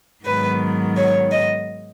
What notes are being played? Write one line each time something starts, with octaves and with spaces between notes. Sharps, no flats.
G#2 D#3 F#3 B3 B4
C#5
D#5